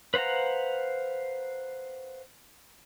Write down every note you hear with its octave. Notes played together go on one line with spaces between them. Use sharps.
B4 C5 F5 F#5 A#5